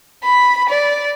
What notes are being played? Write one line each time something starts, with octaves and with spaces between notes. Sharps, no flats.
B5
D5